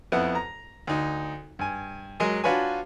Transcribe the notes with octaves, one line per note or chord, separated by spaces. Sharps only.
F2 B3 E4 F#5
A#5
D2 D#4
G2 G#5
F#3 G#3 A#4 D#5 G#5
D4 F4 F#4 B4 C#5 G#5